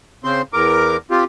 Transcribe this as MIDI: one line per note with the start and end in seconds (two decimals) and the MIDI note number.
0.24 0.42 49
0.24 0.42 60
0.24 0.42 72
0.24 0.42 84
0.53 0.97 40
0.53 0.97 70
0.53 0.97 86
1.11 1.24 60
1.11 1.24 65
1.11 1.24 67